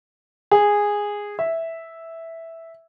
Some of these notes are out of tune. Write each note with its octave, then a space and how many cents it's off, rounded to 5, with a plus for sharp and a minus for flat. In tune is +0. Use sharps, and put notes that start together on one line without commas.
G#4 -10
E5 -5